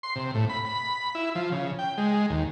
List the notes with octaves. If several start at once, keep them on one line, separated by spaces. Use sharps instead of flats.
C6
C3
A2
B5
B5
E4
F3
C#3
G5
G#3
D#2